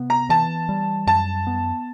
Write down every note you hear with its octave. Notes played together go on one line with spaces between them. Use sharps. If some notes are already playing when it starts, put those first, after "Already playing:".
Already playing: C3 B3
A#5
E3 A5
G3
F#2 A5
B3